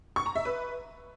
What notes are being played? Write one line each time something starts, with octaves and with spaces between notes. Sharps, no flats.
C#6
A#5
E5
B4